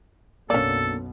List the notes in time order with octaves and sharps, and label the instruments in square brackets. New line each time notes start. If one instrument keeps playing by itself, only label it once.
[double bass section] B1 F#2 B2 [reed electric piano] A#3 D4 [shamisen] C#4 D5 [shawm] A4